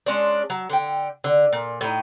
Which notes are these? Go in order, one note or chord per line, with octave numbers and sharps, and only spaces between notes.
G#3 C#4 D4
F#3
D3 G5
D3
A#2
A2 D#4